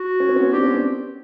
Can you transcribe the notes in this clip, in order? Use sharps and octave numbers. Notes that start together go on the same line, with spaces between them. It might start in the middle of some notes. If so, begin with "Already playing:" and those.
Already playing: F#4
C#4
C4
B3 C#4
C4 D4 G4
B3 C#4
C4 D4